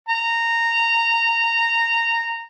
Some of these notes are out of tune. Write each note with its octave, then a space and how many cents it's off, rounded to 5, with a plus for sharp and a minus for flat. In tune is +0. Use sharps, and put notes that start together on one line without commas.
A#5 -15